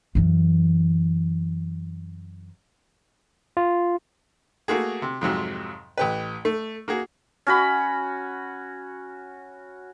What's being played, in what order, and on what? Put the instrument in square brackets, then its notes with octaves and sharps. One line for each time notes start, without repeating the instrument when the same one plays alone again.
[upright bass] F#2 E3
[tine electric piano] F4
[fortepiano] A3 A#3 F#4 G#4
C3
F2 G#2 C3 F#3
A1 G4 B4
A3
A#3 F#4 G#4
[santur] C#4 F#4 B5